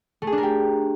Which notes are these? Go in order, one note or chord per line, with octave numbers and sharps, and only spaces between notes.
A3
G#4
D4
A#4
G4